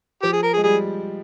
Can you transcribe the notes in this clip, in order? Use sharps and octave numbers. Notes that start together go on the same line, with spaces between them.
F3 G4
G#4
A#4
G#4
G#3
G3 G#4